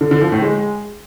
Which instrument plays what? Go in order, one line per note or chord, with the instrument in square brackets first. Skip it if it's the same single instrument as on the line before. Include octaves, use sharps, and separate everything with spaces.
[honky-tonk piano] D3
D3
F3
A2
G#3